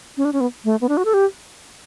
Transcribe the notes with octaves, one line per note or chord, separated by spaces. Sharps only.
C#4
D4
C#4
B3
A3
B3
D4
F#4
A4
G4